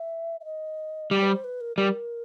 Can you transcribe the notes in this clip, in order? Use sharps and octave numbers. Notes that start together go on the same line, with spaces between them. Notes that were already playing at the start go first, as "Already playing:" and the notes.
Already playing: E5
E5
D#5
G3 D5
B4
C5
B4
A#4
G3 A#4